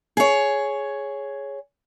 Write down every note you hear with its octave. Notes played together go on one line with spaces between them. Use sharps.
G#4 C#5